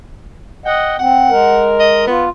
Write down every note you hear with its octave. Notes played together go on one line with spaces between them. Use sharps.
D#5 F#5 G5
C4 F#5
G#3 A#4
D#5
B3 F4